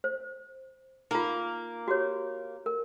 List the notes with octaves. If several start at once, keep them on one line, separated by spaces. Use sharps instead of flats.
C5
A#3 D#4 F4
F#4 G4 C#5
A#4